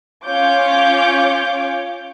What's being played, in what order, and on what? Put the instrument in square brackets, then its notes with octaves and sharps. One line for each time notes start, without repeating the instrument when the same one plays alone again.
[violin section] C#4 F4 C#5 D6 G6